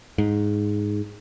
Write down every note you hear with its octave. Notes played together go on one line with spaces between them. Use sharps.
G#2